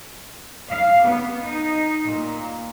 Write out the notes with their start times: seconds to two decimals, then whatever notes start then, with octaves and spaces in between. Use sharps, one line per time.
0.70 F5
1.03 B3
1.46 D#4
2.04 A#2